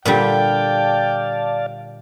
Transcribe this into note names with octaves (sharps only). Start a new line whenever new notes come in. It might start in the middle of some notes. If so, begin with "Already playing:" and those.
A#2 D3 G3 D5 F5 G5 A5